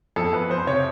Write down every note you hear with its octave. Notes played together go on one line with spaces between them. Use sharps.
F2 A4
F2 B4
F2 C5
C3 C#5